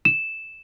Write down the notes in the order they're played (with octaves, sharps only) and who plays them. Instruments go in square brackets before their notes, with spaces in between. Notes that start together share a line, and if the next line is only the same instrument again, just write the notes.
[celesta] E7